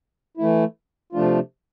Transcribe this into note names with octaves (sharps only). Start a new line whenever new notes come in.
E3 A3 E4
C3 F3 A3 D4 F4